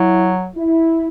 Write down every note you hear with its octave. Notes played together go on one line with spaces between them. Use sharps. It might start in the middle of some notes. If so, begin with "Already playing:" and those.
Already playing: F#3 E4
E4